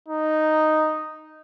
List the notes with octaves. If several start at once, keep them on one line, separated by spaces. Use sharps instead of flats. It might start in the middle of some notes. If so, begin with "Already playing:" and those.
D#4